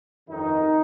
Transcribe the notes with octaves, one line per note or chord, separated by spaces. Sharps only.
G1 F2 D#3 D#4